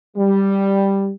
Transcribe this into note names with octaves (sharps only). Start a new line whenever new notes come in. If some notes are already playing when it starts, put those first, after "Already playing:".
G3